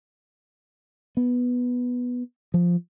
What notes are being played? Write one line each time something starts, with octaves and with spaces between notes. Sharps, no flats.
B3
F3